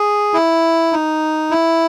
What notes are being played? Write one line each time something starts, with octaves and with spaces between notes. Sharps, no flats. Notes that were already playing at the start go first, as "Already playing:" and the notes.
Already playing: G#4
E4
D#4
E4